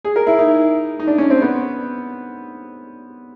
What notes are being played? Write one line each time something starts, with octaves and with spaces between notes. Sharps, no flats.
G#4
A#4
E4
D#4
D#4
D4
C#4
C4
B3